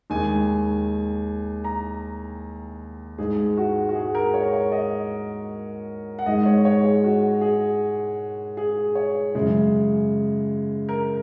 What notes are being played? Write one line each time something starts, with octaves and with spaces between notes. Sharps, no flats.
D#2 D#3 G#3 G#5
A#5
G#2 G#3 G#4
F#4
F#4
G#4
A#4
C#5
C#5
D#5
F#5
G#2 G#3 D#5
C#5
C#5
G#4
F#4
G#4
G#4
C#5
F#2 C#3 G#3
A#4